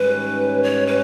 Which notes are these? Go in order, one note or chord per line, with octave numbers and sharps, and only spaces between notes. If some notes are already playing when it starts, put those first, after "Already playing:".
Already playing: G#2 D#3 G3 C#4 B4
C#5
B4